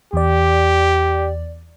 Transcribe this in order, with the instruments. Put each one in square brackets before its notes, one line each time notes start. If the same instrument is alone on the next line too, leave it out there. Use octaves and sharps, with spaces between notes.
[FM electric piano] E2 D5 [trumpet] G4